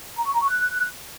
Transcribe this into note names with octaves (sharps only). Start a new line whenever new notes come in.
A#5
C#6
A#5
C#6
F#6